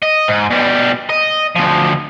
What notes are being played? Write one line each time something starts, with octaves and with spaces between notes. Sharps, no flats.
D#5
G#2
B2 G3
D#5
D2 F3